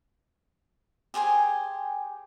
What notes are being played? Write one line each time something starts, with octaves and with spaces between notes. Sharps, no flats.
G4 G#4 C5 G#5